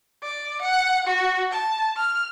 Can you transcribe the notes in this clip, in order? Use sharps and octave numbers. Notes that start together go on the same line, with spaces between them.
D5
F#5
F#4
A5
F6